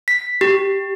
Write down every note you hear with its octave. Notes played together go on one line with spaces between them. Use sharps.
B6
G4